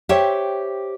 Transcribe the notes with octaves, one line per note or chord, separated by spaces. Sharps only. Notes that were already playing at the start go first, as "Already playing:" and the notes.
G4 C5 C#5 E5 G5